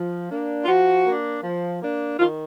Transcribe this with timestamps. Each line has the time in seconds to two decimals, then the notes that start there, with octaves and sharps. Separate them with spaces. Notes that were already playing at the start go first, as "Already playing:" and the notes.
Already playing: F3
0.30 A#3 D4
0.62 F4
0.68 F3 F#4
1.06 A#3 D4
1.44 F3
1.81 A#3 D4
2.19 D#3 F4